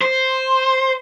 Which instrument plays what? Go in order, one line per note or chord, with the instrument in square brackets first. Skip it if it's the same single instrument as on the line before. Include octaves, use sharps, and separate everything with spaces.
[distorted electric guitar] C5